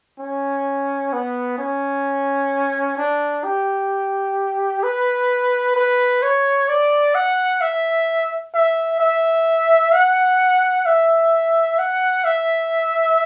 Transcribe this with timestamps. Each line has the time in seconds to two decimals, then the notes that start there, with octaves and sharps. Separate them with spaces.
0.19 C#4
1.13 B3
1.58 C#4
2.97 D4
3.44 G4
4.83 B4
5.76 B4
6.22 C#5
6.69 D5
7.15 F#5
7.61 E5
8.54 E5
9.00 E5
9.93 F#5
10.86 E5
11.78 F#5
12.25 E5